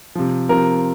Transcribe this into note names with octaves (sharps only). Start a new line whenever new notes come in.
C3 F3
C3 F3 A#4